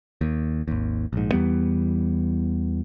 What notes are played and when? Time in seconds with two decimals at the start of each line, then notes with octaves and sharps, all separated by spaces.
0.21 D#2
0.68 G#1 D#2
1.13 A#1 G#2
1.32 E2 E3 G3 B3